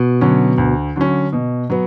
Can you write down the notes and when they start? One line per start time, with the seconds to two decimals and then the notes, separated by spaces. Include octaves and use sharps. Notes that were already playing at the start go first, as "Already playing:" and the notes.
Already playing: B2
0.21 D3 F#3 C#4
0.58 D2
0.96 D3 F#3 C#4
1.33 B2
1.70 F#3 B3